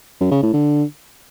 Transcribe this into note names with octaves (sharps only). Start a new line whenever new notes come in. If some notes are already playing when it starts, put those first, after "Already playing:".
F#2
C#3
A2
D3